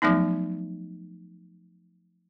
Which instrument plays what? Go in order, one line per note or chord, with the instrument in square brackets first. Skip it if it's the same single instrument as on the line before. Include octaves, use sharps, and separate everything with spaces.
[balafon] F3 F#3 A3 B3 D#4